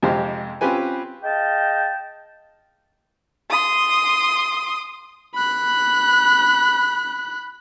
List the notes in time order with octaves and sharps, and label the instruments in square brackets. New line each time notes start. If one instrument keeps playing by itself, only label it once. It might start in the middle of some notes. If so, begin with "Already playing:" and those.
[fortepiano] F2 C3 G#3 G4 C5 F5
C4 C#4 F4 G4 B4 G#5
[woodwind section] G#4 D#5 F5 G5 A5
[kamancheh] C6 D#6
[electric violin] B5 F#6